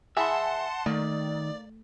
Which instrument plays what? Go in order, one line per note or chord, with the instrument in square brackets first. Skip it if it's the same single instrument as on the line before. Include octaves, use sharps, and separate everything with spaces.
[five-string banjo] E3 G#4 B5 [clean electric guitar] E5 [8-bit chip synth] F#5 A5 C6
[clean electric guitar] D#3 [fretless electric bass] A3 [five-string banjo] A#3 [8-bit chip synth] D5